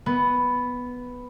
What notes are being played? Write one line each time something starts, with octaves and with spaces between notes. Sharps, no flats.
B3